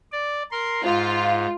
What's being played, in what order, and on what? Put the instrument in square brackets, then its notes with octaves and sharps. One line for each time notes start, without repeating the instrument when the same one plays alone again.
[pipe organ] D5
A#4 C6
[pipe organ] G#2 [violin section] F4